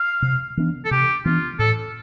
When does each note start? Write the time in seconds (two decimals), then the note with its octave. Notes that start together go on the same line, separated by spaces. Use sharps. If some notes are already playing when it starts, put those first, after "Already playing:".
Already playing: F5
0.22 C3
0.57 E3 B3 D4
0.85 A4
0.91 C3 G4
1.25 E3 B3 D4 F4
1.59 A2 A4